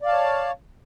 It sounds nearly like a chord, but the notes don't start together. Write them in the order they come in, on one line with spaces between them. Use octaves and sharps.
D5 F5 A5 C#5